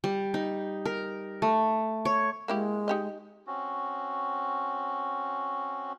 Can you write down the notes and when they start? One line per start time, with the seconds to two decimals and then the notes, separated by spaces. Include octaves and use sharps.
0.04 G3
0.34 D#4
0.85 A#4
1.42 A3
2.05 C#5
2.48 G#3 A#3 E4 G4
2.88 D#4 G4 D#5
3.47 C4 C#4 F#4